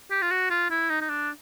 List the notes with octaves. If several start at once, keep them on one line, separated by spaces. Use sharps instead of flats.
G4
F4
F#4
F4
E4
D#4
D#4
D4